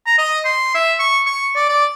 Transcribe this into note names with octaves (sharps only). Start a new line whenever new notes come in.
A#5
D#5
C6
E5
C#6
C#6
D5
D5